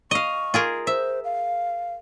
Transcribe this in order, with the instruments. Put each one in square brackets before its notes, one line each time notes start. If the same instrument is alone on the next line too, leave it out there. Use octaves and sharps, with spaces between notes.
[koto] D#5 F5 [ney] C#6
[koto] F4 G#4 A#4
[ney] C5 [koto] E5
[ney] F5